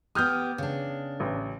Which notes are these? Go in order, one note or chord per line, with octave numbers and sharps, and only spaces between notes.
B3 G4 D#6 F6 G6
C#3 D4
A1